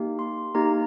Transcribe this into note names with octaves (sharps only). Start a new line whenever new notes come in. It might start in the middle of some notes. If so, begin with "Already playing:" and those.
Already playing: A#3 D#4 G4
C6
A#3 D#4 G4 A#5